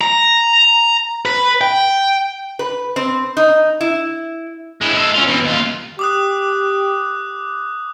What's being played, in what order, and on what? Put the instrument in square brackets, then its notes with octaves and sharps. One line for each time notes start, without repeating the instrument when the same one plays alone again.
[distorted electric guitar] A#5
B4
G5
[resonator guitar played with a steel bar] B4
C4
D#4
E4
[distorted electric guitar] G#3 E4
G#3 A4
C#4 F4
B2 E3
D#2 F4
[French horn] G4 [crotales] D6 D#6 F#6